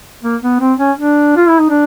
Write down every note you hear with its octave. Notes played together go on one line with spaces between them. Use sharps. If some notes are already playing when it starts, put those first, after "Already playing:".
A#3
B3
C4
C#4
D4
F4
E4
D#4
D4